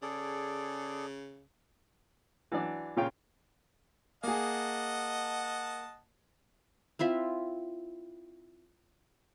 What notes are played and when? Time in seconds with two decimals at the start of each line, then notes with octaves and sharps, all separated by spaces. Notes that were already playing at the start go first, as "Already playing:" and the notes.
0.02 C#3 G#4 A4 D5
2.52 E3 F#3 D4 D5
2.97 A#2 C#3 F4 C#5 F5 G5
4.24 A#3 G#4 D#5 F#5 A5
6.99 C4 E4 F4 E5